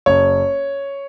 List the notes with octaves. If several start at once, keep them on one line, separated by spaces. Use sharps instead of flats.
F#1 C#5